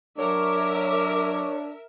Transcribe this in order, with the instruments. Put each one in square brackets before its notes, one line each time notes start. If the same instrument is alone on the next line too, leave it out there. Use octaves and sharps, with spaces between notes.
[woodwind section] F#3 D6 [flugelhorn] D4 [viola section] A#4 E5 [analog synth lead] C#5